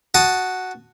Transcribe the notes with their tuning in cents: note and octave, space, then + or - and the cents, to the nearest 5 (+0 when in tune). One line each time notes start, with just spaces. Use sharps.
F#4 +0 A5 +0 D#6 +0